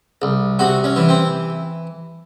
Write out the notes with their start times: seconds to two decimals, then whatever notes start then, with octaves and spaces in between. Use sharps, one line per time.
0.22 C2
0.59 C3 F#4
0.84 C#4
0.96 E3
1.09 C4